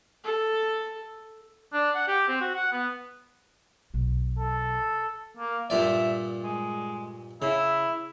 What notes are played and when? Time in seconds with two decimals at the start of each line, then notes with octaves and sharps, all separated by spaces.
0.24 A4
1.73 D4
1.95 F#5
2.08 G4
2.28 C4
2.41 F#4
2.55 F#5
2.72 B3
3.94 B1
4.39 A4
5.37 A#3
5.70 G2 A#2 D5 E5
6.44 G#3
7.42 C#3 E4